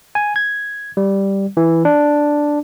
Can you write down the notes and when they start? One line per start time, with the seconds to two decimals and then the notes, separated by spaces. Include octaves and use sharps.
0.15 G#5
0.36 G#6
0.97 G3
1.57 E3
1.85 D4